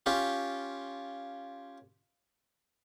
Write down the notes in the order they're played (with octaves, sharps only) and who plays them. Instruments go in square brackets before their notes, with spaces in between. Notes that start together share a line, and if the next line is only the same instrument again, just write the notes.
[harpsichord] C#4 F4 G4